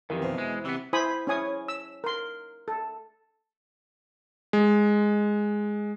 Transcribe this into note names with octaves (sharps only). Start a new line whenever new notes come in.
F2 D#3 E3 G4 A#4
E2 B2 C5
G#3
C3 E3 B3
E4 C5 G#5 B5 D#6
C#4 E4 C#5 G#5 D#6
E6
A#4 C6
A4
G#3